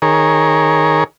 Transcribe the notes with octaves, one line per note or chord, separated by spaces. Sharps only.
D#3 G#4 A#4 C#5